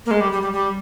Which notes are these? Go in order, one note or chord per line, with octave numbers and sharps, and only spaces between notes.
A#3
G#3
G3
G3
G3
G3